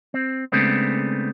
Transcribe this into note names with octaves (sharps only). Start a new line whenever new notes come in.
C4
C#3 G#3 A3 B3 C4 D4